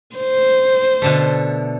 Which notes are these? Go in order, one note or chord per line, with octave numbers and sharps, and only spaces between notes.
C5
B2 D3 A3